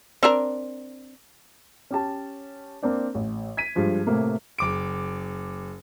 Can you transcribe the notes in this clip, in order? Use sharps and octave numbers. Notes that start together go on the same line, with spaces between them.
C4 D4 A#4
C#4 G4 A5
A#3 C4 D4
A1
G#6 B6 D#7
G2 F3 G#3
A2 C3 A3 A#3
F#1 D6 D7